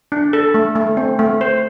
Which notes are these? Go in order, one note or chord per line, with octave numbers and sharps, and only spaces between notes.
D4
A4
A3
A3
C4
A3
C5